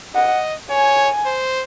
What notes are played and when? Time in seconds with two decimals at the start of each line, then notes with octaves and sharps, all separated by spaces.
0.15 D#5 F#5
0.71 C#5 G#5
1.26 C5